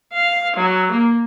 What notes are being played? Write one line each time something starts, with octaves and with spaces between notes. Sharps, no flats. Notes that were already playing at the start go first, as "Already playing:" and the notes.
F5
F#3
A#3